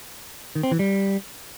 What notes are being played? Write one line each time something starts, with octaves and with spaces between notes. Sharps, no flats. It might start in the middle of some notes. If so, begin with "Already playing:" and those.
D#3
C4
E3
G3